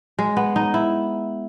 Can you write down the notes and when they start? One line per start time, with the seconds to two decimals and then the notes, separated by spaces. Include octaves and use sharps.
0.19 G#3
0.37 B3
0.56 D#4
0.74 E4